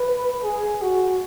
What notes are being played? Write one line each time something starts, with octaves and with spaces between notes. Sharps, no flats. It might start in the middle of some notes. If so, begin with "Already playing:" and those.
Already playing: B4
G#4
F#4